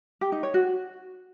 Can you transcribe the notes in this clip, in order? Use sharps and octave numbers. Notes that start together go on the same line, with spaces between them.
G4
D#4
C#5
F#4